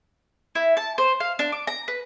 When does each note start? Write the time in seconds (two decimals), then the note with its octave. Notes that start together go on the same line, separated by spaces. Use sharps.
0.55 E4
0.77 A5
0.98 C5
1.20 F5
1.39 D4
1.52 D6
1.67 A#5
1.88 B4